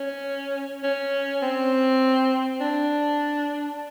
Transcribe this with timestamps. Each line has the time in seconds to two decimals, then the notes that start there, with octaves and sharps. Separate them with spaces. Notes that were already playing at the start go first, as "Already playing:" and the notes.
Already playing: C#4
0.84 C#4
1.42 C4
2.61 D4